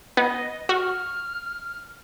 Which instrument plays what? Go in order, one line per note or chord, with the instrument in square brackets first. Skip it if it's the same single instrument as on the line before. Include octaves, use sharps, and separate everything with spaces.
[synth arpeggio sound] B3 [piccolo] D#5
[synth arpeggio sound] F#4 [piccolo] F6